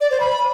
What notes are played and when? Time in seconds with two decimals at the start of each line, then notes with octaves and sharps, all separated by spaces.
0.01 D5
0.11 C5
0.20 B5